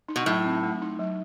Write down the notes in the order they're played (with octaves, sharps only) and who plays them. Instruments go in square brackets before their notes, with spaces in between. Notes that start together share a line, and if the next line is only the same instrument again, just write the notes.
[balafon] D#4
[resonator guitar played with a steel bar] B2
[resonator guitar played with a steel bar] A2 [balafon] F#3
[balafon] C4
A3
D#4
F#3